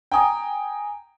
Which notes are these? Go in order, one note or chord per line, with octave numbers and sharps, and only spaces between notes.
G5 G#5 A#5 D#6